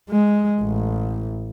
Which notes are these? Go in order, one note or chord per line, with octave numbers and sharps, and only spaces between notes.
G#3
A1